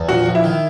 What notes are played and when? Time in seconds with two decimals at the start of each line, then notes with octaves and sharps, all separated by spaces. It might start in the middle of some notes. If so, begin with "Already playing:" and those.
Already playing: E2
0.09 A#1 F#4
0.26 A#1
0.35 E4
0.44 D#3